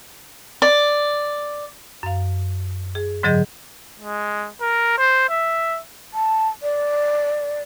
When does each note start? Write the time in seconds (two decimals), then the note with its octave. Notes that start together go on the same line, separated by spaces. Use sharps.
0.62 D5
2.03 F#2 F5
2.95 G#4
3.23 G#2 D3 F#3 G#4 D#5 G6
4.00 G#3
4.61 A#4
4.98 C5
5.30 E5
6.14 A5
6.63 D5